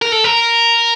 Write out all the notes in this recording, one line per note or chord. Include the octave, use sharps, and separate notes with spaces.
A#4
A4
A#4